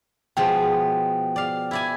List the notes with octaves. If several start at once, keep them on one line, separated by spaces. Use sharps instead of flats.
B2 F3 G#3 G5
D5 F5
E4 D5 G#5